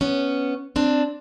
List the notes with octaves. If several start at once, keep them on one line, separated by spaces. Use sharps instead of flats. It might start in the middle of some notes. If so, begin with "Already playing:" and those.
B3 C#4
C4 D4